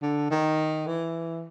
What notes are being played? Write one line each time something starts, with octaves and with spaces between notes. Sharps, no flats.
D3
D#3
E3